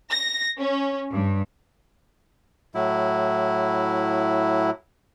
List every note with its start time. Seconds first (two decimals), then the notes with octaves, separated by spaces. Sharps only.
0.11 A#6
0.58 C#4
1.10 G2
2.75 A2 F#3 E4